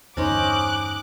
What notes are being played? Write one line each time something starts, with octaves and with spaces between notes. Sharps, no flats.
E2 G2 D3 C#4 D#4 C5 D6 F#6